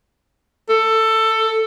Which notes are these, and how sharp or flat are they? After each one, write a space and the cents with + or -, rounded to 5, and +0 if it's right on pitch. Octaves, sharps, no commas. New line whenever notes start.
A4 +15